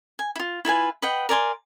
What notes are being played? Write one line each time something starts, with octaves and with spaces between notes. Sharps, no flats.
G#5
E4 F4
E4 F4 B4 G#5
B4 D#5 F#5 G5
A#4 D5 G#5 C6